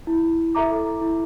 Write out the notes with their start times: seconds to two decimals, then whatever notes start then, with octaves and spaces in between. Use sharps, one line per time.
0.07 E4
0.55 A4 E5 A#5 D6
1.01 E4